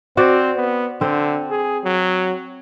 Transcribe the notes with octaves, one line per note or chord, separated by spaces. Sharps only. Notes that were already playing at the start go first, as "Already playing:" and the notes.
C4 F#4 C5 D5
B3
D3 C4 C5
G#4
F#3